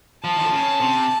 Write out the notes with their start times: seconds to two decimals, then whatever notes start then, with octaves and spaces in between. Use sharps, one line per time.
0.24 F3 A5
0.36 D#3
0.44 D3
0.52 C#3
0.80 C3